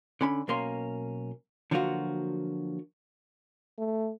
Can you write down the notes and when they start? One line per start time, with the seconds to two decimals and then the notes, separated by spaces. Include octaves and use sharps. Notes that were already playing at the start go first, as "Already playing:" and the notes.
0.21 D3 C#4 B5
0.48 B1 B2 A#3 C#4 C6
1.71 D3 F3 F#3 A#3 F4 F#4
3.79 A3